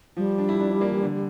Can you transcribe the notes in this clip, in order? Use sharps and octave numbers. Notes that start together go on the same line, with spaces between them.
F3 G3
D4
E4
D4
D4
A#3
E3
D3